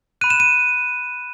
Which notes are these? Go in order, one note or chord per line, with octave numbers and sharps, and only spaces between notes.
B5 F#6 D#7
E7
D#7